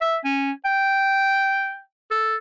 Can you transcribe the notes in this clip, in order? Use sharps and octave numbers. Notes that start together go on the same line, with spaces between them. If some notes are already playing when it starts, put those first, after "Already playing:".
E5
C#4
G5
A4